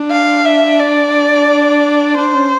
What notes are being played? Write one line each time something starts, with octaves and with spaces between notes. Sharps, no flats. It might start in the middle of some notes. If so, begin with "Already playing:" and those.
Already playing: D4
F5
E5
D5
D4 C5
C#4